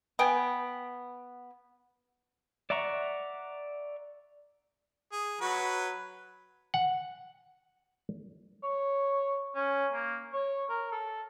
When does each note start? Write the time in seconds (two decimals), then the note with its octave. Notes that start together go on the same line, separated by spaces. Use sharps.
0.19 B3 G5 G#5
2.70 D5 E5 F#5 A#5 C#6
5.12 G#4
5.41 F#3 F#4 B4
6.74 F#5
8.63 C#5
9.55 C#4
9.93 A#3
10.33 C#5
10.69 A#4
10.92 A4